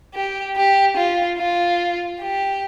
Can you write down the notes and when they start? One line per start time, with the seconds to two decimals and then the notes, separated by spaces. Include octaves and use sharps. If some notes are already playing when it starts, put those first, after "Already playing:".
0.15 G4
0.56 G4
0.97 F4
1.39 F4
2.21 G4